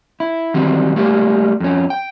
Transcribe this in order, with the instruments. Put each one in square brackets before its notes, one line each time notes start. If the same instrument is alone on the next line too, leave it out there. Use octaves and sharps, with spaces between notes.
[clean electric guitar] E4
D#3 E3 F#3 G3 C4
G3 A3 A#3 G4
F2 C#4
G5